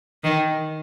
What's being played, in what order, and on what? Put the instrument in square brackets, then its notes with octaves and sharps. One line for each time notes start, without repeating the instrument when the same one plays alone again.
[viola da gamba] D#3